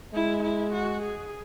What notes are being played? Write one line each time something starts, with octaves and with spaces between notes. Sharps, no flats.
G#3 E4
E4
F#4
G#4